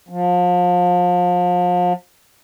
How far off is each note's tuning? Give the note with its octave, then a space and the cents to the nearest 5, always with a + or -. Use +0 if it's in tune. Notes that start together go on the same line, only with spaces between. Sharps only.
F3 +35